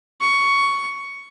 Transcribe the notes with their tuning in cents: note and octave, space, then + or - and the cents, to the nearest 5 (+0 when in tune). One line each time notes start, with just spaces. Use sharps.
C#6 +10